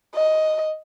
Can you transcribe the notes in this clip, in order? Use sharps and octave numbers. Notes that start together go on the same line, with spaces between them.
D#5